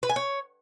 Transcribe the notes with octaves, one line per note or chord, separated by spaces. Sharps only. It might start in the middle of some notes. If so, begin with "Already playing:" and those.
B4
G#5
C#5